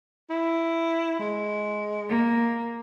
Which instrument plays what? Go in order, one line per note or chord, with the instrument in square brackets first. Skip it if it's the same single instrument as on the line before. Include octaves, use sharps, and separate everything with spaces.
[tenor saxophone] E4
G#3
[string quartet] A#3